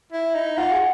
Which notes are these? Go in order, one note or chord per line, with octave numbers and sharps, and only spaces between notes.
E4
D#4
F4 F#5
G#4